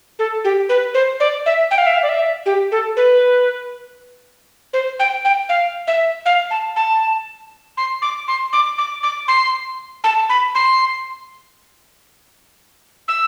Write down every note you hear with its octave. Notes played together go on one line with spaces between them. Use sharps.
A4
G4
B4
C5
D5
E5
G5
F5
E5
F5
D5
E5
G4
A4
B4
C5
G5
G5
F5
E5
F5
A5
A5
C6
D6
C6
D6
D6
D6
C6
A5
B5
C6
E6